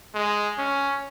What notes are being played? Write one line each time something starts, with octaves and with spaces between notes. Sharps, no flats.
G#3
C#4